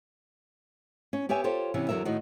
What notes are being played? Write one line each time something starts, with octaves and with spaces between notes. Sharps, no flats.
C#4
B3 G4 C#5 E5 G#5
F4 G4 A4 C5 C#5
C3 E3 B3 C#4
E2 D3 F#3 C#4 A#4 E5
A2 D#3 D#4 F#4